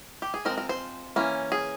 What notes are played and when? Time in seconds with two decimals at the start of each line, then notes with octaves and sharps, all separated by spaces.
0.22 G4
0.34 G#4
0.45 F3 G#3 C4 A#4
0.58 A#4
0.69 C5
1.16 E3 A#3 C#4
1.52 G#4